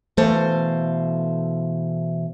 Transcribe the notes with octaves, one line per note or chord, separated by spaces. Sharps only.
B2 E3 A3 C5 F5